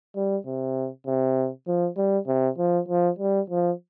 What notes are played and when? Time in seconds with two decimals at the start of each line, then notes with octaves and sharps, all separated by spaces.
0.16 G3
0.46 C3
1.07 C3
1.68 F3
1.97 G3
2.27 C3
2.58 F3
2.88 F3
3.19 G3
3.50 F3